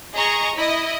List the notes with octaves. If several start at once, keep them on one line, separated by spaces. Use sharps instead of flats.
G#4 D#5 A#5 C#6
E4 D#5